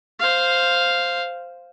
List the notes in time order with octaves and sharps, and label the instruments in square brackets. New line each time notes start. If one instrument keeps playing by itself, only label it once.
[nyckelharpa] C5 F5